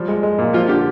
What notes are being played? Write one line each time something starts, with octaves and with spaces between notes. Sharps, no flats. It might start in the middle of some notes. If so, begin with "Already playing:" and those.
Already playing: F3 G3
G#3
G#3
A#2
F3 F4
D3 G4